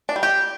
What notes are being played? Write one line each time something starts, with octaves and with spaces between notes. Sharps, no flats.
D4
G3
G4